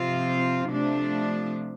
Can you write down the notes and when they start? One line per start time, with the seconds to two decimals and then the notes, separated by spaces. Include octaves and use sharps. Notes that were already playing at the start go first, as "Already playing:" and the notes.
Already playing: C3 F3 C4 F4
0.70 C3 F3 A3 D4